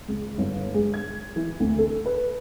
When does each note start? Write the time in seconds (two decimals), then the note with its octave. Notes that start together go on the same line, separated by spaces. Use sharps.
0.08 C#2
0.38 G1
0.74 G#3
0.94 G#6
1.36 E3
1.60 D2
1.78 A4
2.06 B4